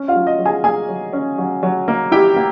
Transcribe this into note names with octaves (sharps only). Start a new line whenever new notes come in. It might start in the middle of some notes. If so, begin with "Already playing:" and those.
Already playing: C#4
F4 F5
F#3
D#5
F#3
G#4 G#5
A#3 G#4 G#5
F#3
C#4
F#3
F#3
A#3
E4 G4 G5
A#3